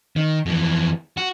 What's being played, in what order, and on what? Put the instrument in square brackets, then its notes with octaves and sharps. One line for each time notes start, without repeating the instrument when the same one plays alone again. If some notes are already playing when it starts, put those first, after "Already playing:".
[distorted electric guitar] D#3
F2 E3
F#4